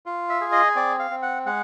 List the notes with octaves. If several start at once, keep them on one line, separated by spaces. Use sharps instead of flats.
F4
E5
G#4
D#5
C4 D5
F5
C4
F#5
G#3 F#5